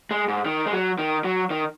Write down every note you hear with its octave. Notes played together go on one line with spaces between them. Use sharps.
G#3
G#2
D#3
G#3
F#3
D#3
F#3
D#3